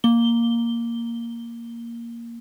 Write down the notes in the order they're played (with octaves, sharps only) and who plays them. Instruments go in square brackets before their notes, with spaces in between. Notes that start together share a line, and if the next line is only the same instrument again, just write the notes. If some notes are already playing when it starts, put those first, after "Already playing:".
[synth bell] A#3 G7